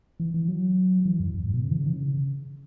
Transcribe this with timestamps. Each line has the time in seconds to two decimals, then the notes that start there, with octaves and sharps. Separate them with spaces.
0.20 E3
0.34 E3
0.48 F#3
1.05 E3
1.20 F#2
1.34 F#2
1.44 G#2
1.54 B2
1.63 C#3
1.71 E3
1.78 C#3
1.86 E3
1.93 C#3